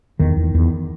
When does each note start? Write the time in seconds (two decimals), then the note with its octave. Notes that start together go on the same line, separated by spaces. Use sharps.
0.19 E2 D#3
0.37 E2
0.55 E2